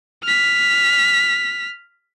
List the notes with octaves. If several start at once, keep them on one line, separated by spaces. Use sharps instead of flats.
F6 B6